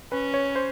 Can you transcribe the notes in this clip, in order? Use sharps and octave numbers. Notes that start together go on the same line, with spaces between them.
C#4 B4
C#5
C5